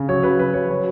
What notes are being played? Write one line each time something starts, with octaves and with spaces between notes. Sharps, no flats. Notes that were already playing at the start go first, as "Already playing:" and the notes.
Already playing: C#3
F#3 C#5
C#3 B4
F#3 B4
C#3 C#5
F#3 C#5